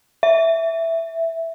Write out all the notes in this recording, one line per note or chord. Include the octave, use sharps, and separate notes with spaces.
E5